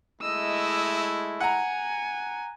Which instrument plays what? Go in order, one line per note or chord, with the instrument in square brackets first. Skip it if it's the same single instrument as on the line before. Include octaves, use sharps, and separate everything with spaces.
[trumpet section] G#3 A3 E4 [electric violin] D#5 E6
[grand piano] F#5 A#5 [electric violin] G#5